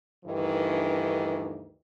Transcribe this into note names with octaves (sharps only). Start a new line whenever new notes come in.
D2 G2 D#3 E3